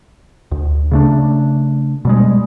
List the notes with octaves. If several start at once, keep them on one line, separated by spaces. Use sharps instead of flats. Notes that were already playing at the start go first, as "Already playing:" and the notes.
D2
C#3 A3 D4
B2 G3 G#3